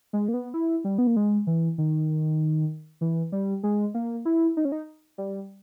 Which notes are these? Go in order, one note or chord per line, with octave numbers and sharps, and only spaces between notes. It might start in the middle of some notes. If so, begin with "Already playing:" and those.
G#3
A#3
B3
E4
G3
B3
A#3
G#3
E3
D#3
E3
G3
G#3
A#3
E4
D#4
C#4
D#4
G3